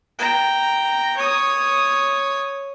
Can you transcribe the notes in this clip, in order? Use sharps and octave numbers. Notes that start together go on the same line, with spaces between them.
G5 A#5
C#5 D#6